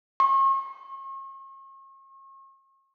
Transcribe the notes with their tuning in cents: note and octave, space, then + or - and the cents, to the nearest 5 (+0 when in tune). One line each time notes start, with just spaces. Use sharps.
C#6 -40